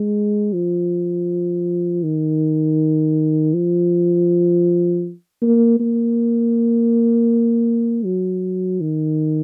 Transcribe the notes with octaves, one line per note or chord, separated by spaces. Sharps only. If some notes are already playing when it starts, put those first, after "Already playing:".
Already playing: G#3
F3
D#3
F3
A#3
A#3
F#3
D#3